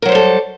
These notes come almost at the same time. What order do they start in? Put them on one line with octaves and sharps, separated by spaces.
A#4 F#3 C5 G3 A4